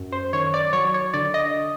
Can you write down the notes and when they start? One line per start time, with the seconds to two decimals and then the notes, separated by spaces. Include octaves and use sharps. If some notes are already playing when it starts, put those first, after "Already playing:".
Already playing: F#2
0.12 C5
0.33 D#3 C#5
0.46 C#5
0.54 D5
0.73 F#3 C#5
0.94 C#5
1.13 D3 D5
1.34 D#5